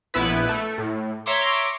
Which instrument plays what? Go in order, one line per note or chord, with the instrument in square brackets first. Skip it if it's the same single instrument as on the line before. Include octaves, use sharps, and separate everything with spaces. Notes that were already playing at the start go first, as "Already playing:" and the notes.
[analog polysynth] A#1 B3 E4 B4
A3
A2
C#5 E5 A#5 C6 D6